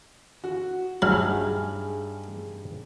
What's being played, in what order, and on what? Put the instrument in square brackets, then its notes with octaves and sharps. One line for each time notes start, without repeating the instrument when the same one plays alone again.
[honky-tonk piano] F#4
[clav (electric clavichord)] G2 D#4 E5 [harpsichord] F#3 [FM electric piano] G#4 [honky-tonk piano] F6